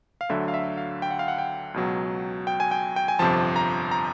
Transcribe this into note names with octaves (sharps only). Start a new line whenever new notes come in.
F5
D2 D3 F#3 E5
F5
E5
F5
G5
F#5
F5
F#5
G5
C#2 B2 F#3
G5
G#5
G5
G5
G#5
G1 F2 C3 F3 A5
A#5
A#5